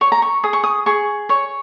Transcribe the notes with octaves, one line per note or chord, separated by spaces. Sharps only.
C#5 C#6
A#5
C#6
G#4 D#6
C#6
D#6
G#4 C#6
C#5 C#6